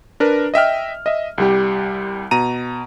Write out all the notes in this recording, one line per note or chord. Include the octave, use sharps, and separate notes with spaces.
D4 A#4 B4
D#5 E5 G5 F6
D#5 E5
C2 G3 G4
B2 A#5 D#7